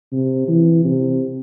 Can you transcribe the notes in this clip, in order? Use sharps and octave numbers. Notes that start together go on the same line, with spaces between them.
C3
E3
C3